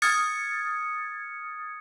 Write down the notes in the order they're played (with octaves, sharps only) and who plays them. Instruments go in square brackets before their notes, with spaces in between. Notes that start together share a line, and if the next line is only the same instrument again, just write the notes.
[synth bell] D#6 F6 G#6 A6 C#7